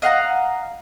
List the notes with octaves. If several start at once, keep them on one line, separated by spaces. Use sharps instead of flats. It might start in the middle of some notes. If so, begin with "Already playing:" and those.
D#5 F5 F#5 A#5